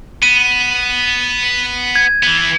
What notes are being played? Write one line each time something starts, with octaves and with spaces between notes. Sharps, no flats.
B3 D#7
G#6
E3 B3